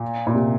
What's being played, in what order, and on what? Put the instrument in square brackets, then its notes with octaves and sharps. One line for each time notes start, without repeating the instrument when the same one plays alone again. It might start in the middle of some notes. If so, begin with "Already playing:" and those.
Already playing: [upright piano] A#2
A#2
C3